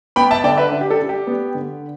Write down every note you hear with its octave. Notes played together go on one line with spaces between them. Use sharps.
B3 G5 B5
E5 A5
D3 D5 G5
B4 E5
D4
G4
A4
D4
G4
B3
D3